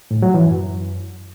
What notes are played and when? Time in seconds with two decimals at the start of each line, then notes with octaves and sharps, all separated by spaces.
0.11 A2
0.22 F#3
0.34 E3
0.46 F#2